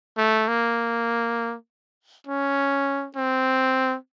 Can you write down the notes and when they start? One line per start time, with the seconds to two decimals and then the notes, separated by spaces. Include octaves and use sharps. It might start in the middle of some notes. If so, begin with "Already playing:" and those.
0.18 A3
0.48 A#3
2.27 C#4
3.16 C4